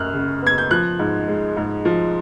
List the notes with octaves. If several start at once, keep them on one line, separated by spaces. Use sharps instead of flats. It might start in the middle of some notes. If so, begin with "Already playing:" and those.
Already playing: F#2 F6 F#6
C#3
B3 G#6
G6
F3 F#6
G#2
G#3
G#2
F3